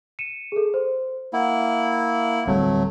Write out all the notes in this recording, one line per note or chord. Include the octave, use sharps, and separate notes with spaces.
C#7 D#7 E7
G#4 A4
C5
A#3 E4 F#5
D1 F#3 G3 A3 C4